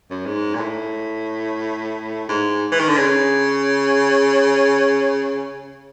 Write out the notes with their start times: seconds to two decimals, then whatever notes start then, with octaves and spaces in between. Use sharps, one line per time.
0.11 F#2
0.26 G#2
0.55 A#2
0.60 A2
2.29 G#2
2.72 E3
2.80 D#3
2.89 D3
2.97 C#3